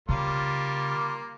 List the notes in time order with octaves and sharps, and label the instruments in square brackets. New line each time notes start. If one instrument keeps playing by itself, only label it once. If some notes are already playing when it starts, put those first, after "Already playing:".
[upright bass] C#3 [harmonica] G3 A#3 F4